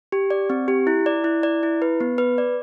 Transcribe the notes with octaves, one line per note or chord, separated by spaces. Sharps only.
G4
D5
C4
G4
E4
D5
E4
D5
E4
B4
B3
B4
D5